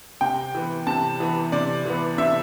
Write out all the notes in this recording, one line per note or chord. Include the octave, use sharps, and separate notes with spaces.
C3 G5
E3 B3
C3 A5
E3 B3
C3 D5
E3 B3
C3 E5